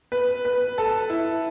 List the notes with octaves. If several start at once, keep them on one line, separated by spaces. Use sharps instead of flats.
B4
B4
A4
E4